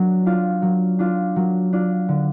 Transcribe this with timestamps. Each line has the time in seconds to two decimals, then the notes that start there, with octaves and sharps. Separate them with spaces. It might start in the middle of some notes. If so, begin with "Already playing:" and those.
Already playing: F#3 D4
0.26 D4 F4
0.62 F#3
0.99 D4 F4
1.36 F#3
1.73 D4 F4
2.09 D3